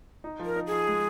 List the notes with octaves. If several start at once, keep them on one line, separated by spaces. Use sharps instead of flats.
D#4
F3
A#4
D#4
F3 G#4
G#3